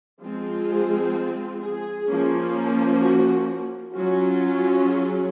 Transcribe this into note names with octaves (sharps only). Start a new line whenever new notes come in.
F3 G#3 C4 F4
G#4
G#4
F3 A#3 C#4
F#4
F#3 C#4 F4 F#4
G#4